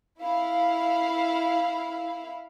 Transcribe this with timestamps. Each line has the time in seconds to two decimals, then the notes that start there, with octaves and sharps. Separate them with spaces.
0.21 E4 F5